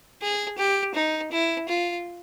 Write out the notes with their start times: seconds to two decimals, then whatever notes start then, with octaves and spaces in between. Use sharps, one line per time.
0.22 G#4
0.58 G4
0.95 D#4
1.32 E4
1.68 F4